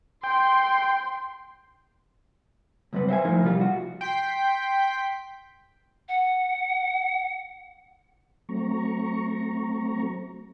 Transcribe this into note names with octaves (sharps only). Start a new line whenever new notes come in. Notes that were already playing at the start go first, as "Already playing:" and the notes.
G5 C6
C#2 F#2 C3 G3 B4
C5 E5 F#5 G#5
A2 F3 D#4 A#4
C3 F3 G3 F4
F#4
G5 C6 B6
F#5
F#3 A3 C4 A#5 C#6